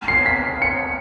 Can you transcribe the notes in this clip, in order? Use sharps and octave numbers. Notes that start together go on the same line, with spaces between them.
C7
B6
C#7